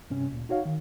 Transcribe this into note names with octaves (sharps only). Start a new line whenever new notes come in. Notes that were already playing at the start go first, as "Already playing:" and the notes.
G2 C3 C#4
D2 A#2
D#4 F#4 C#5 F5
D#3